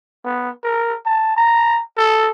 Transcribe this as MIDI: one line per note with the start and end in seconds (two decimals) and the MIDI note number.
0.25 0.50 59
0.63 0.95 70
1.06 1.34 81
1.36 1.79 82
1.97 2.31 69